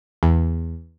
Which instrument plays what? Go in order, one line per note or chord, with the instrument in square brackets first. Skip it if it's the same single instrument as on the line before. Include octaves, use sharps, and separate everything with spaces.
[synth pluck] E2